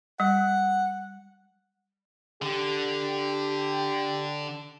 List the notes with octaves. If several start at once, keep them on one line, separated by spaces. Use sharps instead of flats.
G3 F#5
D3 G4